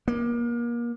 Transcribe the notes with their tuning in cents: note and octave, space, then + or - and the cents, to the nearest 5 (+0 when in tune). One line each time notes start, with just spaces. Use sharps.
A#3 +30